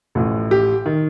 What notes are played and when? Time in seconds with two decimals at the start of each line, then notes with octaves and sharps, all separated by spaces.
0.15 A1 A2 F3
0.51 G4
0.86 D#3